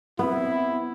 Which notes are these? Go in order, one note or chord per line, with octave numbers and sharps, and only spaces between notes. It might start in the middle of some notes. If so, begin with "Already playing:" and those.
B3 C4 E4